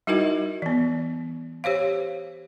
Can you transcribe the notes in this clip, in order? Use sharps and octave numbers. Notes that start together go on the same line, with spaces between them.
G3 D#4 E4 F#4 A#4 D#5
E3 B3
G4 C5 C#5 F5